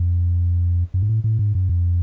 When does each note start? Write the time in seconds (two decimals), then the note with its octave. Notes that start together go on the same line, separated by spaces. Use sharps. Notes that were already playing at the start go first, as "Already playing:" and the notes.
Already playing: F2
0.94 F#2
1.02 G#2
1.09 A2
1.24 A2
1.39 G#2
1.55 F#2
1.69 F2